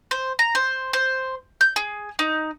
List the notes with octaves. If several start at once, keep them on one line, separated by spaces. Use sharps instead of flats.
C5
A#5
C5
C5
G6
G#4
D#4